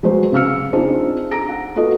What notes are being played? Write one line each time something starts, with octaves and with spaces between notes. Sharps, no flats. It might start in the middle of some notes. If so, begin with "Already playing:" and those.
F#3 G#3 B4 C5
C#3 F5 E6 F6 C#7
C4 D4 D#4 F4 G#4 C5
A#5 A#6 D7
F#5
F4 F#4 A4 B4 D#5